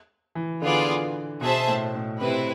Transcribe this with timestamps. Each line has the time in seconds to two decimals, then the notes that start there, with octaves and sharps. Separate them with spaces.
0.35 E3
0.62 D3 B3 F4 G#4 D5
1.41 B2 G#4 C5 E5 A5
1.67 A2
1.95 A2
2.21 C3 C4 E4 B4